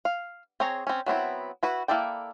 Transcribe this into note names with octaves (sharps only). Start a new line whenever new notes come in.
F5
C4 G#4 C#5 A#5
C4 C#4
F#3 B3 C4 E4
E4 F#4 B4
A#3 E4 A4 D5 G5